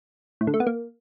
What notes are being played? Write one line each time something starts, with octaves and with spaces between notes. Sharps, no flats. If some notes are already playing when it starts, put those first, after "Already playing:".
A2
D3
A3
B3
A#3